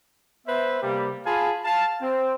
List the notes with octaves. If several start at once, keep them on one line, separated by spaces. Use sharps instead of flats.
B3 B4 C5 E5
C3 G3 A#3
F4 G#4 F5 G#5 A5 B5
F5 A5
C4